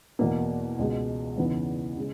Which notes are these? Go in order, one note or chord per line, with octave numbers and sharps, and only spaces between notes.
E2 B2 A#3
C#2 B2 G#3
E2 C#3 E3 B3 D#4
C#3 G#3